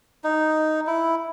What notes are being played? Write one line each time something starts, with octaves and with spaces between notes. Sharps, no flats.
D#4
E4